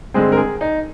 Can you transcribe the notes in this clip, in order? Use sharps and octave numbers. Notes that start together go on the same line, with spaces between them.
G2 D3 G#3 C4 G#4
A#4
G#4
D#4